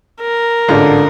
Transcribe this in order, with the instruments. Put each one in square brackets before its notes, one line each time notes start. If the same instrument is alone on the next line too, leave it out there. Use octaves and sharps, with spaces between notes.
[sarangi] A#4
[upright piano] A1 G#2 F4 [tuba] D3